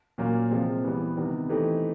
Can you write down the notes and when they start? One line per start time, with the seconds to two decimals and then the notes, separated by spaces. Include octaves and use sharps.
0.18 A#2 F#3 A#3 C#4
0.51 C3 F3 G#3 C4
0.84 E3 G3 B3
1.17 C3 D#3 G3 B3
1.49 E3 A3 C4 D#4 G4